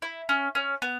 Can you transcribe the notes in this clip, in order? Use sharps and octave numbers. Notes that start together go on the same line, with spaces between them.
E4
C#4
C#4
B3